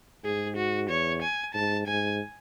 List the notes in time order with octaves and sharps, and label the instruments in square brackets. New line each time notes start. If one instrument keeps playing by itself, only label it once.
[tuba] G#2 [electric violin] G#4
[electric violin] F#4
[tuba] E2 [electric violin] C#5
[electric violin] G#5
[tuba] G#2 [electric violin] A5
[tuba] G#2 [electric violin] G#5